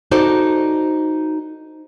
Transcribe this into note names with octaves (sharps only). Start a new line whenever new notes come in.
D#4 F#4 A4 C5 D5